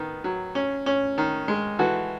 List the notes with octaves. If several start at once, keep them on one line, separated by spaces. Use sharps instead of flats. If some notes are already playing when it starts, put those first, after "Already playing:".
Already playing: D#3 B3
F#3
C#4
C#4
D#3
G#3
E3 F#4 A4